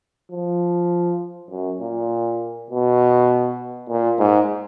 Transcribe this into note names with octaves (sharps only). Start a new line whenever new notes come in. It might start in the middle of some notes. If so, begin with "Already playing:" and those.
F3
F#2
A#2
B2
A#2
G#2